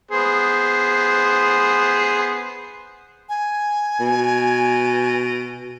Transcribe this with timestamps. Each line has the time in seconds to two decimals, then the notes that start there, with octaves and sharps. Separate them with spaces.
0.11 B3 G#4 C5
3.29 G#5
4.00 B2